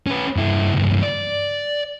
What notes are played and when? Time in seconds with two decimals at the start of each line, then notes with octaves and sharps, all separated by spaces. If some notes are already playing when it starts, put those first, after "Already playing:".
0.07 C#4 B4
0.36 G2 E4
0.73 C#2 G2
1.03 D5